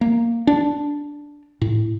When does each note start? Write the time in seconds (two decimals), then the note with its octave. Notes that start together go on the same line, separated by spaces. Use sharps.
0.01 A#3
0.47 D4
1.61 A2